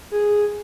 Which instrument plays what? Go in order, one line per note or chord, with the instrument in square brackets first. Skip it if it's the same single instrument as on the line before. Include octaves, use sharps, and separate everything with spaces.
[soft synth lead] G#4